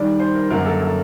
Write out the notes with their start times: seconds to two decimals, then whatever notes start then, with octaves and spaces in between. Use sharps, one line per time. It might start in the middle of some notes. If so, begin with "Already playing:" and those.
Already playing: D#3 G3 D4 D5
0.20 C5
0.35 A#4
0.50 F#2 D3 F#3 A#3 A#4
0.66 A4
0.82 A4